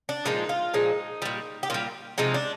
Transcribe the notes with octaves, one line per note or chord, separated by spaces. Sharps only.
D4
A#2 F3 G#3 D#4
F4
A#2 F3 G#3 D#4
A#2 G3
G4
A#2 G3 F4
C3 F3 G#3 D#4
D4